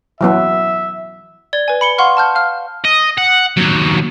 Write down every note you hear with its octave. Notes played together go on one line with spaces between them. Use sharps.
E3 F#3 B3 E5
D5 G#6 G7
B4 G#5
B5 C#7 G7
F5 F#5 C6 C#6 F6
A5 F6 G6
F5 F6
D#5
F#5
D#2 F#3